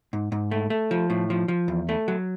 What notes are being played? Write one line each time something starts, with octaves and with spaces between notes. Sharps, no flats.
G#2
G#2
A3
A3
F3
A2
F3
F3
E2
A3
F#3